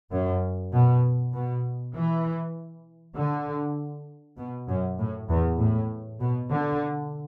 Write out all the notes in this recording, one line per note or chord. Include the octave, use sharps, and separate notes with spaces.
F#2
B2
B2
E3
D3
B2
F#2
A2
E2
A2
B2
D3